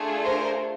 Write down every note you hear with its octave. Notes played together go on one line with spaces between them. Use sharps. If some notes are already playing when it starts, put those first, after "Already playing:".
Already playing: A3 D4 F4 G#4
A#4 C5